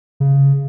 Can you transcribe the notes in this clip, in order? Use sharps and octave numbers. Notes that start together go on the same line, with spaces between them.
C#3